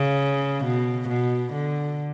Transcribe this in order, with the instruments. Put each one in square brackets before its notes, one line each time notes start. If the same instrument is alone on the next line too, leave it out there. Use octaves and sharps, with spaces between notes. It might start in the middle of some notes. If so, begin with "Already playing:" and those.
Already playing: [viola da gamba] C#3
B2
B2
D3